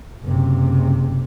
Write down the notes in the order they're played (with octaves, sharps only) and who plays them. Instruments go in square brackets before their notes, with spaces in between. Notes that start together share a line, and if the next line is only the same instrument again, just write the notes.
[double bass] F#1 C3